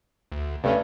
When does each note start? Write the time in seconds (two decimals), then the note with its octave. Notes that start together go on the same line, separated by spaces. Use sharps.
0.32 D2
0.64 G2 C3 A3 C#4